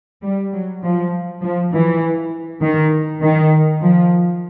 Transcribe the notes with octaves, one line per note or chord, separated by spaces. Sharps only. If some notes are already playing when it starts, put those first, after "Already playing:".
G3
F#3
F3
F3
E3
D#3
D#3
F3